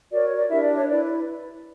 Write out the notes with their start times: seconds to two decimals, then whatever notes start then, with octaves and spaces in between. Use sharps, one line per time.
0.11 F#4 A#4 C#5 D5
0.24 C#5
0.36 D5
0.48 D4 E4 G4 A#4 E5
0.62 D5
0.74 C#5
0.87 E4 B4 D5